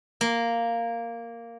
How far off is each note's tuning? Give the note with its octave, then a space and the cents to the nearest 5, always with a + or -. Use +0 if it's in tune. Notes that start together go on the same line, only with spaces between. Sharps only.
A#3 -5